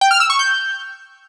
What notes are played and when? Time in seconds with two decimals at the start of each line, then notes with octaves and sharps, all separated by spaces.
0.01 G5
0.11 F6
0.20 E6
0.30 C#6
0.39 G6